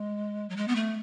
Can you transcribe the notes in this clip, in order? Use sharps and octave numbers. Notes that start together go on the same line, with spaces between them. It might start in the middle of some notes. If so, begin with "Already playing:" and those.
Already playing: G#3
F#3
G#3
B3
A3